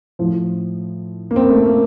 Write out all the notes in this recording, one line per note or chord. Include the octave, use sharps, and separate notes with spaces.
A2 F3
A#3
C4
A3
A#3